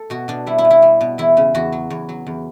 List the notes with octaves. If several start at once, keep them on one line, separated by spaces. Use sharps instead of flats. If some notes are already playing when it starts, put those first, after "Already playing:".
Already playing: A4
B2 F#4
B2 D4
G3 E4
E4
B2
E4
G3
B2
E2 E4
C#3
E2 F#4
F#3
E2 C#5
F#3
E2